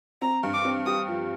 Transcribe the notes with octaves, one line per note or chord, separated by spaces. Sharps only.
C4 A#5
G2
D6
C4
G4 D#6
F3